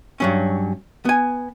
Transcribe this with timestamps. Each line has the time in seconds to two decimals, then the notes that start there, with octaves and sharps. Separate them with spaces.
0.20 G2 F#3 C#4
1.05 B3 G#5